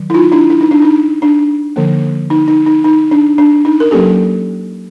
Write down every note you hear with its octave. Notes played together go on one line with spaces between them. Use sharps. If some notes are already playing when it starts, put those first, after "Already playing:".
Already playing: D#3 F#3
E4
D#4 F4
D4 E4
E4
D#4
D4
D#4
D4
D3 F3 A#3
D#4
D#4
D#4
D#4
D4
D4
D#4
A#4
F#3 A#3 C#4 G4 A4